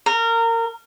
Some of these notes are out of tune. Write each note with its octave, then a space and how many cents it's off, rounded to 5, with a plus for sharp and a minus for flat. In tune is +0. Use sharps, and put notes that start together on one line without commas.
A#4 -25